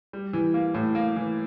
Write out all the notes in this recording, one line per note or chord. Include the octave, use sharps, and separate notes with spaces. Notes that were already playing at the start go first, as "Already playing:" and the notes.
G3
E3
A#3
A2
A#3
E3